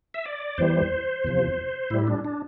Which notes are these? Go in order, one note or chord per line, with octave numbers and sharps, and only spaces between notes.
E5
D5
E2 E3 G3 C5
E2 C3 F3
A2 G3 E4
D4
D4